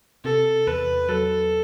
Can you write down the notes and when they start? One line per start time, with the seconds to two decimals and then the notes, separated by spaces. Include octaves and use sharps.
0.24 C3 A4
0.67 E2 B4
1.08 F#3 A4